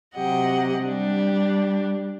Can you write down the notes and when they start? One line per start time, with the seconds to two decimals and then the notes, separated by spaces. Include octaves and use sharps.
0.15 C3 F#3 G4 D#5 F#5
0.84 G3 D4 G4